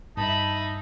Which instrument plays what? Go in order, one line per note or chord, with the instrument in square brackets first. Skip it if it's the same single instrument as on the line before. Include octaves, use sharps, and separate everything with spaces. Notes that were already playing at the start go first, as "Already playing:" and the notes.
[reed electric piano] G2 [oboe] D#4 [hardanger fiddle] E5 B5 [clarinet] A5